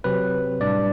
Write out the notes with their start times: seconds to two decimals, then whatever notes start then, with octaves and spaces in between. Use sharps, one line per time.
0.04 C3 F#3 C4 B4
0.60 A2 G3 D4 D5